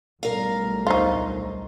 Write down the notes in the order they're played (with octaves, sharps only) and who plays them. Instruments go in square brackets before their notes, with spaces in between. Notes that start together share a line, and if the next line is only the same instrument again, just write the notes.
[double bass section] B1 A2 G3 [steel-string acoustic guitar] A#4 F5
[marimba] D2 C5 C#6 [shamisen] D#4 F4